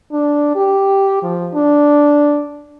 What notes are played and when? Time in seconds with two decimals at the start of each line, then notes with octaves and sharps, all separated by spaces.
0.12 D4
0.55 G4
1.23 F3
1.54 D4